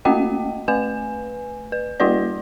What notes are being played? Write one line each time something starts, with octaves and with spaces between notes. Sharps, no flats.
A3 A#3 C#4 F#4 D#5 G5
A3 B4 G#5
B4
G3 A#3 E4 F#4 B4 D5